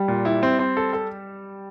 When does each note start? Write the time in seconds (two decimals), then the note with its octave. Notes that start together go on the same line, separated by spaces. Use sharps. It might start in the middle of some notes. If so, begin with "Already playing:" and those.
Already playing: G3
0.08 A#2
0.25 E4
0.43 C4
0.59 C4
0.77 A4
0.93 A4